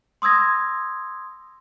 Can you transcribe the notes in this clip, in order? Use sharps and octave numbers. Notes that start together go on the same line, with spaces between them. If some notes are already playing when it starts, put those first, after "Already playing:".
C6 D#6 E6 G#6 A#6